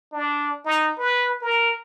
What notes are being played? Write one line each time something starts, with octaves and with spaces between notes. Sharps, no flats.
D4
D#4
B4
A#4